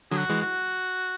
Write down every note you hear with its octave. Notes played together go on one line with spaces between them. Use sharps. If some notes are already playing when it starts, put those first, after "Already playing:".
D3 F#3 G#4
F#4
E3 G#3
F#4